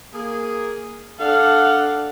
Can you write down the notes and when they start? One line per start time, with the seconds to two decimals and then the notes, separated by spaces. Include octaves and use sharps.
0.14 A#3 G#4
1.20 D4 A4 F5 F#5